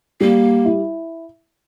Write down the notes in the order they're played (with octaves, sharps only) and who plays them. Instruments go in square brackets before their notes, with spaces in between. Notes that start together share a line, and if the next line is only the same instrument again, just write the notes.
[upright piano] G3 [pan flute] A#3
[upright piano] E4